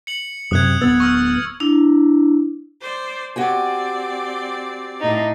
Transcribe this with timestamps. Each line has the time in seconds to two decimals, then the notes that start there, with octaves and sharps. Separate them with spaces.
0.07 C#7 F#7
0.51 F#2 C3 D#6 F#6 G#6
0.81 D1 F#2 B3 E6 A6
1.00 C#6 E6 F6
1.60 D4 E4
2.81 C5 D5
3.36 C4 F#4 G4 D5 G#5
5.01 A2 D#4